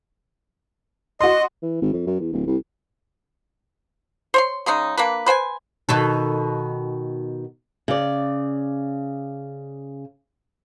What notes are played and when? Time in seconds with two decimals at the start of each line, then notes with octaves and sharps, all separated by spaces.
1.21 F#4 D#5 C6
1.62 E3
1.81 G#1
1.93 F2
2.07 F#2
2.20 E2
2.33 D1
2.46 C2
4.34 C5 C#5 C6
4.66 C#3 G#3 C#4 D#4
4.97 A#3 D4 B4
5.26 B4 C5 G5 G#5
5.89 B2 D#3 A4
7.88 C#3 D5